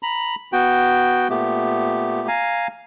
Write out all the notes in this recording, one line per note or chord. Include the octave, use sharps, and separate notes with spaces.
A#5 B5
B3 F#4 G5
A#2 A3 B3 G4
F5 G#5 A#5